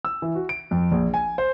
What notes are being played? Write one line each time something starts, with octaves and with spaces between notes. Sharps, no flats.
E6
E3
F#4
D7
F2
A#1
G#5
C5